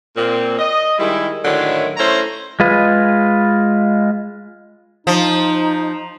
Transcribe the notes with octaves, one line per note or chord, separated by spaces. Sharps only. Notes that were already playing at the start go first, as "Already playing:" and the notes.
A#2 C4
D#5
D#3 G3 G#3 E4
A2 D3 D#3 F#3 G#3 E4
A3 C#4 E4 C5 A#5 C6
G#3 F4 B4
F3 D#4